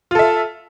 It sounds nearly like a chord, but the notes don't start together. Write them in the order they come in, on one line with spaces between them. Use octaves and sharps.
F4 A4 E5